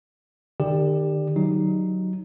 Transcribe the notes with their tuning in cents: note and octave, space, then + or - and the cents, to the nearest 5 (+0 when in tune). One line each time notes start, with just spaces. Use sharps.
D#3 -45 G4 +15 D5 +0
F#3 +5 D#4 +0